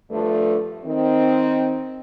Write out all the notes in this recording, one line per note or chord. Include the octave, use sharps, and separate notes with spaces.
G2 D3 F3 A3
D#3 C4